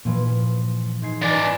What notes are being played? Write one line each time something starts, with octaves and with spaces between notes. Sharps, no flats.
G2 A#2 E3 F3
G#2 G#6 C7
E3 D#4 D5 G#5